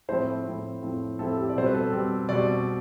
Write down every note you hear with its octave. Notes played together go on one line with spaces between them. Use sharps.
A2 F3 C4 E4 C5
A2 F3 C4 E4
A2 F3 C4 E4
A2 F3 C4 E4 A4
G4
D5
B2 G3 C4 C5
B4
A4
B2 G3 C4
B2 G3 C4 D5